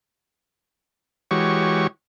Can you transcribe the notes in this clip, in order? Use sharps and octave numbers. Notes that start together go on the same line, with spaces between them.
E3 G#3 F#4 G4 C#5 C#6